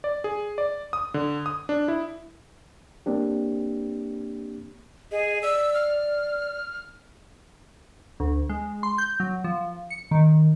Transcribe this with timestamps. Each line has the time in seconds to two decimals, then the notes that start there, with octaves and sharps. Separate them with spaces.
0.04 D5
0.24 G#4
0.58 D5
0.93 D#6
1.14 D3
1.46 D#6
1.69 D4
1.88 E4
3.06 A#3 C4 D4 G4
5.12 G#4 D#5
5.43 D5 E6
5.74 F6
8.20 D2
8.49 G#3
8.83 C6
8.98 G6
9.20 F#3
9.44 F3
9.90 C#7
10.11 D#3